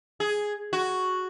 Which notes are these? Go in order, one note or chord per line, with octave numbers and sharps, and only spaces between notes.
G#4
F#4